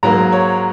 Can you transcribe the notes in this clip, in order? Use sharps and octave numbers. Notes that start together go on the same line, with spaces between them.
G#2 F#3 A#3 A#5
C#5